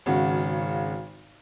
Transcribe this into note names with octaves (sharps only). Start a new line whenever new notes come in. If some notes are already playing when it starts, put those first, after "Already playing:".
G#1 C#3 F#4